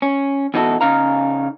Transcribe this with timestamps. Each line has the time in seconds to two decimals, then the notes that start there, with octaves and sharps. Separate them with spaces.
0.02 C#4
0.54 E2 B2 D#4 F#4 A4 E5
0.81 C#3 D#4 F5 A#5